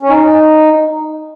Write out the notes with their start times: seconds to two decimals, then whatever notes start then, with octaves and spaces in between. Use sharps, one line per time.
0.02 C#4
0.09 D#4